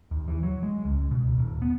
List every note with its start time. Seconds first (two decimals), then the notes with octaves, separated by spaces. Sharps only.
0.11 D#2
0.28 E3
0.43 F#3
0.63 G#3
0.85 C#2
1.11 B2
1.26 D#1
1.38 D#1
1.62 B3